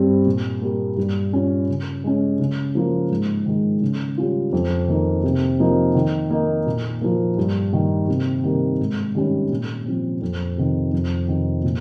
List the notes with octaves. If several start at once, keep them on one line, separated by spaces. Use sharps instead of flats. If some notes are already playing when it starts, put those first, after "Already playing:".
Already playing: G2 G3 C4
A#2
G3 A#3
G2
G3 C#4 F4
C#3
G#3 C#4
C#3
F3 A#3 F4
G#2
D#3 G#3
C#3
G3 C#4 F4
F2
D#3 A#3 D#4
C3
F3 A#3 D#4
D#3
A#3 D#4
A#2
F3 A#3
G2
D#3 A#3
C3
D#3 G3 A#3
G#2
D#3 G3 C#4
A#2
F3 C4
F2
C3 D#3
F2
C3 D#3
A#2